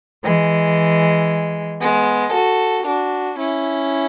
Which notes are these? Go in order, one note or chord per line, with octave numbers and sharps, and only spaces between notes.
E3 G#3
G#3 B3
F#4 A4
D4 F#4
C#4 E4